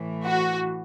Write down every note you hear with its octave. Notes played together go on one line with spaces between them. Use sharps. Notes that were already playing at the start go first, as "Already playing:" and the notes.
Already playing: A2 E3
F#4